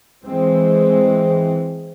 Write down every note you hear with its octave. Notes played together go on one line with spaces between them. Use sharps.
E3 G#3 C4